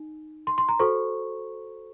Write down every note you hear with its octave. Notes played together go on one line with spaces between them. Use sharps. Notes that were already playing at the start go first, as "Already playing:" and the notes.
Already playing: D#4
C6
C6
A#5
F#4 A4 C5 C#6